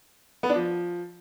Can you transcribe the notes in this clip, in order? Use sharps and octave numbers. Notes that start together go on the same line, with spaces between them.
B3
D4
F3